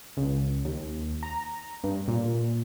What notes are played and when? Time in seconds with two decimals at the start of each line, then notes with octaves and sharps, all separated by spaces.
0.17 C#2
0.65 D#2
1.23 A#5
1.84 G2
2.08 A#2